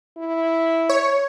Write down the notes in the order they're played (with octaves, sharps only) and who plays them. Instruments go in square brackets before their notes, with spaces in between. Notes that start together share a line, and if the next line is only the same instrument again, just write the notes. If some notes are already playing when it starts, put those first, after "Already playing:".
[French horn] E4
[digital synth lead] C#5